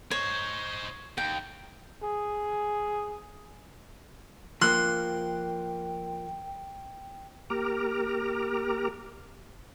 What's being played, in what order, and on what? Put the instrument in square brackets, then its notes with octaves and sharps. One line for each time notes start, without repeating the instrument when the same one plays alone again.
[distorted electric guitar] D#4 C5 [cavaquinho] C#5
[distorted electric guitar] D#2 [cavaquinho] G5
[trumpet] G#4
[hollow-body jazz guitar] F3 A#3 [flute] G5 [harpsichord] C6 [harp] F#6
[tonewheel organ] A#3 G4 A#5 D6 F6